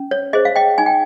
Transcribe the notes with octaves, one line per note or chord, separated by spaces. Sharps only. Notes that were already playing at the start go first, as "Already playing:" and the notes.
Already playing: C#4
C#5
G#4 C5 D#5
F5
D#5 G5
D#4 G#5
G5